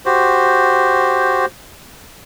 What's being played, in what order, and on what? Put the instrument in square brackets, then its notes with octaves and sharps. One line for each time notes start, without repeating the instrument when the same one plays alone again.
[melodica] F#4 G4 C5